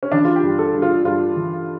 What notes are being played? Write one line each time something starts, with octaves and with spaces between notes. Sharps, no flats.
C#4
E3 D4
F4
G4
G2
A4
G2
F4
G2 F4
E3